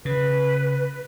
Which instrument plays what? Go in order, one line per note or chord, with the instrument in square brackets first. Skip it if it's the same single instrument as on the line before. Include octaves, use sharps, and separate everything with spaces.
[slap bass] C#3 [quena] B4